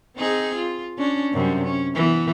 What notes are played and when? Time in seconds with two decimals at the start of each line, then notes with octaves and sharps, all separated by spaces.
0.16 C4 D#4 G#4
0.55 F4
0.98 C#4 D4
1.33 F#2 C3 G3
1.64 C#4
1.95 E3 B3